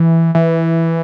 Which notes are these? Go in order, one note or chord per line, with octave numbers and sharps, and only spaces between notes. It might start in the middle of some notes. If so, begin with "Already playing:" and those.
Already playing: E3
E3